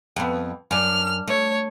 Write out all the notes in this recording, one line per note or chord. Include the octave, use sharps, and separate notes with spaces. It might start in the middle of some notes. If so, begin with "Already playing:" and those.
F2 B3
F#2 D4 F6
A3 C#5